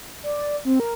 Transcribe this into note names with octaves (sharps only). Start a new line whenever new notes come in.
D5
C4
A#4